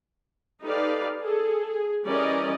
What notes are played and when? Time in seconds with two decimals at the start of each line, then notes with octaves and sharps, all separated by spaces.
0.64 D#4 G4 A4 B4 D5 F5
1.22 G#4 A4
1.70 G#4
2.06 E3 G3 C#4 A#4 D5 D#5